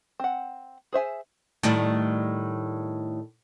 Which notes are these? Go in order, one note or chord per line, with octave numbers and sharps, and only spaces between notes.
C4 F#5
G#4 C5 E5 G#5
A2 D#3 G3